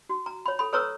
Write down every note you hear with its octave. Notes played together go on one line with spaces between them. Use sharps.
F#4
A#5
C#5 B5
A4 B5
A4 B4 C#5 A#5 C#6 E6